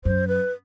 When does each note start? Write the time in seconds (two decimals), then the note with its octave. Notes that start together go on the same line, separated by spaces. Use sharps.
0.05 F#2 C5
0.28 B4